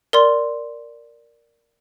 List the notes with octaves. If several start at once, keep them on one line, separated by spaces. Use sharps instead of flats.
A#4 D5 C6